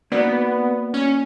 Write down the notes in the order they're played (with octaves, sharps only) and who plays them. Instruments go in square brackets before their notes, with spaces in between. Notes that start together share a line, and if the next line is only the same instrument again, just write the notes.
[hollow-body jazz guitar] A#3 D#4 F#4 B4 D5 [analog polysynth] B3
[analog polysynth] C#4